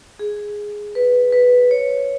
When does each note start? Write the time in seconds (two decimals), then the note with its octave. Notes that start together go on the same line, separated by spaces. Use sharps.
0.19 G#4
0.95 B4
1.33 B4
1.71 C#5
1.89 C#5